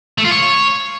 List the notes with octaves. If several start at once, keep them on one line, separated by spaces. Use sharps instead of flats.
A3
F4
C#5